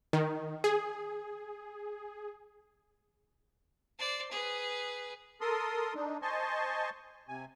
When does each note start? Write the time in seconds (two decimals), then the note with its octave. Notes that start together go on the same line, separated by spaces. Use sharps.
0.13 D#3
0.64 G#4
3.98 C5 D5
4.31 G#4 B4
5.41 A4 A#4 C6 D#6
5.95 D4 D#4
6.22 C5 D#5 G#5 A5 C6 C#6
7.28 C3 G#5